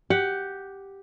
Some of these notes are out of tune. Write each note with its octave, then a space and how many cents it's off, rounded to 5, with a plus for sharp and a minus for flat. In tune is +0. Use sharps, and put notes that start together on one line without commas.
G4 +0 F#5 +10